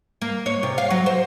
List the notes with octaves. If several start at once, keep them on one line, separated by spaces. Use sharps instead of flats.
A#3
C#5
C3
F5
F#3
C5